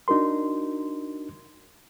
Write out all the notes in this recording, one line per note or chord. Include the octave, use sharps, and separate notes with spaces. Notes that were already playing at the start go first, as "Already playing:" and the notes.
D4 D#4 F#4 A#4 C6